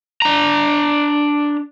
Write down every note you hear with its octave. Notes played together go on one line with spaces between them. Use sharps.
D4 A#5